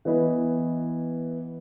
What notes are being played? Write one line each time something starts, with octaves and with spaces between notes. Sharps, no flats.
E3 B3 E4 B4 D#5